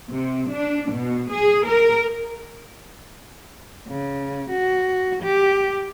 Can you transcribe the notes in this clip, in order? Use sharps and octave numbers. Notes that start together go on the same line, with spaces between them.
C3
D4
B2
G#4
A#4
C#3
F#4
G4